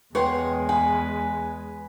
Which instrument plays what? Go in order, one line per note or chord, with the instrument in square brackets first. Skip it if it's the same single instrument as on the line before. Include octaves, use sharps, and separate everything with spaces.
[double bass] E2 G#3 [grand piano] B4 G5 [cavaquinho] C#5 F#5 C6
[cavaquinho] B4 [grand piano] G#5